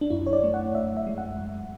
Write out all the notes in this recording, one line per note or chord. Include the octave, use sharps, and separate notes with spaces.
D4
F#2 E4
C#5
D5
A3
F#5
F#2 E5
E5
G#3
F#5
F#2